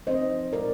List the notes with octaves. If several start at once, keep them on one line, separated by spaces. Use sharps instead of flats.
F3 C4 D#4 C5 D#5
A#2 G#3 C4 A#4 D5